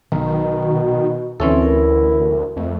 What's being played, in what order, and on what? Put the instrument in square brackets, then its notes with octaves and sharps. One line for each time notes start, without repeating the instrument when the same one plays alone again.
[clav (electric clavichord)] B1 [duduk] B2 [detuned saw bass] D#3 [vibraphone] A#5
[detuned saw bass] D2 [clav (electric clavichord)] E3 C#4 A4 [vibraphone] C4 E4 E5
[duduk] E4 [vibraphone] A#4
[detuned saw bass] F2 [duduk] A3